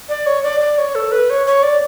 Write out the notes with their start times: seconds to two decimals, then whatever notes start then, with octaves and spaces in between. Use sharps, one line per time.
0.09 D5
0.26 C#5
0.43 D5
0.61 D5
0.78 C#5
0.95 A4
1.12 B4
1.30 C#5
1.47 C#5
1.63 D5